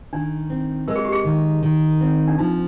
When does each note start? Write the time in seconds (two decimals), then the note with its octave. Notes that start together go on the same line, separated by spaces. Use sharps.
0.13 D#3 D4
0.50 C4
0.88 G#3 A#4
0.96 G#4
1.05 G4
1.12 G#4
1.25 D#3
1.63 D#3
2.01 C4
2.27 D4
2.38 F3 D#4